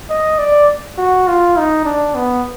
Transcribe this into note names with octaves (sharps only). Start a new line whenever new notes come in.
D#5
D5
F#4
F4
D#4
D4
B3